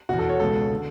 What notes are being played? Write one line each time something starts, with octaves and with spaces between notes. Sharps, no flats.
E2 B2 F#4
A4
C#5
C#2 B2 A4
D3